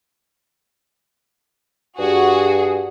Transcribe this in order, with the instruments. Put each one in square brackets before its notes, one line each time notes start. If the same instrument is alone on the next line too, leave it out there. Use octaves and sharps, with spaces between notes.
[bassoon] G2 [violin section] F#4 G#4